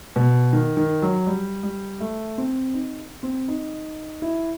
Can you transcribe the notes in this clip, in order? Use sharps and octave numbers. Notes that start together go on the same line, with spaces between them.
B2
D#3
D#3
F#3
G3
G3
A3
C4
D#4
C4
D#4
E4